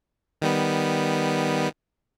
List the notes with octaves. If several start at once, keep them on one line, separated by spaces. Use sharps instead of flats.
D#3 G3 B3